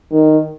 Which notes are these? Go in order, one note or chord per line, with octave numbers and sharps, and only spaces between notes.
D#3